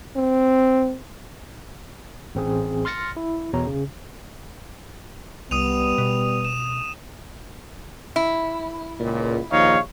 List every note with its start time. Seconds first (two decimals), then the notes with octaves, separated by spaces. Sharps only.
0.16 C4
2.35 A1 C4 G#4
2.85 C6 F6 A6 A#6 C#7
3.17 E4
3.53 E2 B2 C#5 A#5
3.67 C#3
5.51 C2 G3 B3 D#6 D#7 F7
5.98 B2
6.45 E7
8.16 E4
9.00 C#2 A#2
9.52 A#1 D#2 D#4 C#5 F5